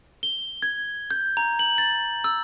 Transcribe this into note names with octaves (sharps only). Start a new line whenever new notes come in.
G7
G#6
G6
A#5
F#7
A6
E6